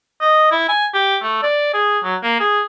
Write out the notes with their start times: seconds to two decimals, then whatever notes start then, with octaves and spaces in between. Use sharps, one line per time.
0.21 D#5
0.51 E4
0.69 G#5
0.94 G4
1.22 A3
1.43 D5
1.74 G#4
2.04 F#3
2.23 A#3
2.40 G#4